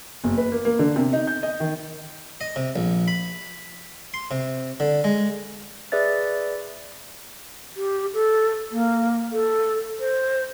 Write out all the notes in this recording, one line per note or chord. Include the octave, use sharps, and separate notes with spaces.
F#1
B4
A#3
A#3
D3
C3
D#4
G6
D#5
D#3
D#5
C3
A#1
B5
C6
C3
D3
G#3
G#4 B4 D5 E5 A6
G4
A4
A#3
A4
C5